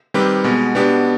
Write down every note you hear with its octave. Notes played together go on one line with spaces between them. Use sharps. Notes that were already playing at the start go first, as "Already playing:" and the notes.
D#3 G3 C4 G4 B4
B2 G#3 B3
B2 B3 D4 G4